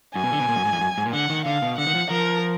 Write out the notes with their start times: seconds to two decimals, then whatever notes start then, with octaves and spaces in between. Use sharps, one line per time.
0.15 F#2 G#5
0.24 B2
0.32 D3
0.40 B2
0.48 A#2
0.56 F#2
0.65 G#2
0.72 F2
0.81 F#2
0.98 G#2
1.05 A#2
1.13 D3 F#5
1.30 D#3
1.45 D3 F5
1.62 B2
1.78 D3 F#5
1.87 D#3
1.95 F3
2.10 F3 A#4